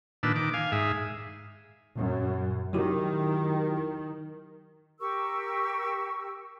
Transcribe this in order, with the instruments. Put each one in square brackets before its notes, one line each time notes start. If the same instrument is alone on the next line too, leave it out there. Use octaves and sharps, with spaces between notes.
[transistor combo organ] A#2 D#3 D4 B4 E6
D#3 D6
F5 G#5
G#2 G#4 E5
[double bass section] F#2 [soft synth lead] A#2
[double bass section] D#3 [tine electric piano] F#3 F#4 G4 [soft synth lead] E4
[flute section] G4 A#4 C#6 E6